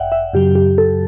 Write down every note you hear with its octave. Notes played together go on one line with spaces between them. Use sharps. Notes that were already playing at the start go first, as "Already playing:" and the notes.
Already playing: G1 F#2 D5 E5 F#5 G5
E5
F#2 C#3 F#3 G4
G4
A4